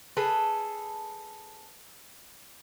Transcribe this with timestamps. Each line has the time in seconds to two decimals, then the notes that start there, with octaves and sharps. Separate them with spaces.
0.17 G#4 A4 B4